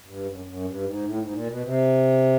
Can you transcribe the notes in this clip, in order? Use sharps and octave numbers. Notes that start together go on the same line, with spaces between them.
G2
F#2
F#2
G2
G#2
A2
G#2
A#2
B2
C3